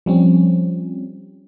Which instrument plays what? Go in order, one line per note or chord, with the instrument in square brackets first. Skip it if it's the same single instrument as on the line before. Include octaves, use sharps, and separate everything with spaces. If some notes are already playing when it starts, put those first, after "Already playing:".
[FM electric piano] F3 G3 C4 C#4